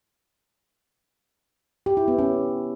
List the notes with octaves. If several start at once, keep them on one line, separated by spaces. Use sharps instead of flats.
G4
E4
B3
C#4